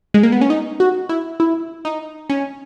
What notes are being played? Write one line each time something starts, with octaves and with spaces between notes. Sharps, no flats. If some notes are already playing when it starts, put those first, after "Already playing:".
G#3
A#3
B3
C#4
D#4
F#4
E4
E4
D#4
C#4